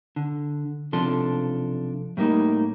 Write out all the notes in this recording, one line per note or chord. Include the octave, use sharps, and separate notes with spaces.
D3
B1 C3 F3 D4 A4 C6
A2 G3 A#3 D#4